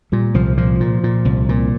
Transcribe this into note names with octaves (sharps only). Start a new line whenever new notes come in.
A#2 G3
C2 F3
A#2 F3
A#2
A#2
C2
A#2